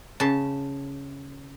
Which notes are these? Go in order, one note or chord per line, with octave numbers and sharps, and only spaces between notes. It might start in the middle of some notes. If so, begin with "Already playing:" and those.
C#3 A5